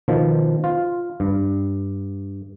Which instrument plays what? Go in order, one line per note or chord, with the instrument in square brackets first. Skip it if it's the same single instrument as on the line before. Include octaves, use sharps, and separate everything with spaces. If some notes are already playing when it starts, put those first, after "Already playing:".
[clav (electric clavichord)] B2 D#3 F3
F4
G2